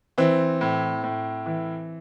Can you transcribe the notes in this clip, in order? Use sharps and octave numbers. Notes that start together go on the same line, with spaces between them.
E3 C4
A2
A2
E3